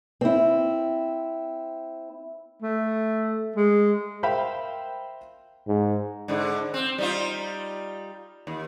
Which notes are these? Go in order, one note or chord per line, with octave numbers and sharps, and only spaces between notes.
C4 E4
A3
G#3
A#4 C5 E5 F5 G5 B5
G#2
G#2 D3
C4
G3 D#4 F4
D#2